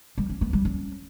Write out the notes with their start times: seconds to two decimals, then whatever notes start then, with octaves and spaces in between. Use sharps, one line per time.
0.18 G3
0.29 C#4
0.41 B3
0.53 G3
0.65 C#4